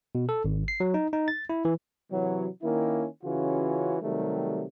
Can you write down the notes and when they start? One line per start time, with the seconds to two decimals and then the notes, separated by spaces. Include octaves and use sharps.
0.15 B2
0.29 A4
0.45 G#1
0.68 C7
0.80 F#3
0.94 D#4
1.13 D#4
1.28 A6
1.49 E4
1.65 E3
2.11 C3 E3 F#3
2.63 D#3 A#3 C#4 E4
3.23 C#3 E3 C#4 F4 F#4
4.03 C3 D#3 F#3 G3 A3